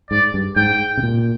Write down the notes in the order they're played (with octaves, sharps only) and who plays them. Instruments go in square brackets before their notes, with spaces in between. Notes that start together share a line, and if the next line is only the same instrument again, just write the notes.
[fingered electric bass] G#2 [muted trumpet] D5
[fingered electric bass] G2
[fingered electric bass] G#2 [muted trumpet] G5
[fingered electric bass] C3
A#2